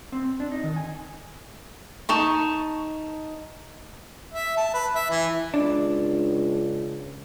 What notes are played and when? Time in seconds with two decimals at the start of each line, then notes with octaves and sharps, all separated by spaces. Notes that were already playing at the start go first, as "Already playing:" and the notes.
0.12 C4
0.40 D4
0.52 D#4
0.64 D#3
0.76 G#5
2.09 D#4 A5 C#6
4.33 E5
4.57 A5
4.74 B4
4.95 E5
5.10 E3
5.54 C#2 D4